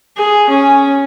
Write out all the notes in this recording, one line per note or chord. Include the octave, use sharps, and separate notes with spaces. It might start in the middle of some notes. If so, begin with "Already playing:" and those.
G#4
C#4